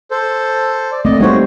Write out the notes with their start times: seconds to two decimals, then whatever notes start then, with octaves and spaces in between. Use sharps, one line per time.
0.11 A4 C5
0.92 D5
1.05 A3 A#3 C4 D5 D#5
1.20 G3 D#4 F#4 C5 C#5